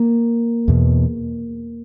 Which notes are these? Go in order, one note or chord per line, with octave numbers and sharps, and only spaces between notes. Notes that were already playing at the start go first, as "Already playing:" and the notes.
Already playing: A#3
E2 B2